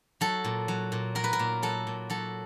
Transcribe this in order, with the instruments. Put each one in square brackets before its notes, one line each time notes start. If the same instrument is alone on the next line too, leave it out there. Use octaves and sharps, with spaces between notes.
[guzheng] F#3 A4
A#2
F#3
A#2
F#3 A#4
B4
A#4
A#2
F#3 A4
A#2
F#3 A4